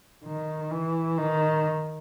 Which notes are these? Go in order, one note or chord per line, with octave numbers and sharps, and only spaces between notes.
D#3
E3
D#3